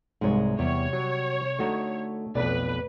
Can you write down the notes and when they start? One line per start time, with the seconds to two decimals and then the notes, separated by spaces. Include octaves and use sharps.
0.21 C2 G#2 G#3 C#5
0.59 E2 C3 G3 C#5
0.93 F#3
1.59 D3 A3 D#4 F#4 A#5
2.35 B1 F2 B4 D5